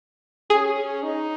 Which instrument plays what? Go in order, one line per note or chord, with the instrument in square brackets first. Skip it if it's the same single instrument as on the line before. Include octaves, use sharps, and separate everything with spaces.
[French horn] C#4 [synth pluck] G#4
[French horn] D#4